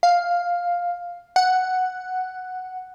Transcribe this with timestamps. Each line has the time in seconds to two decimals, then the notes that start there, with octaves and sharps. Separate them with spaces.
0.03 F5
1.36 F#5